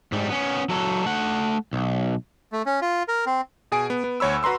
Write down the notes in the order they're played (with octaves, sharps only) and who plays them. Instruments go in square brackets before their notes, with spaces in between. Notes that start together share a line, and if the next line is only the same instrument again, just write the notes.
[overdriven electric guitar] G#2 G3
B3 C#4
F#3 A4
A3 F#5
B1
[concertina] A3
C#4
F4
A#4
C4
[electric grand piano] B2 G#4 G#5 D7
B3
B3
D2 C#5 B5 E6
F#4 B4 A#5 C6 E6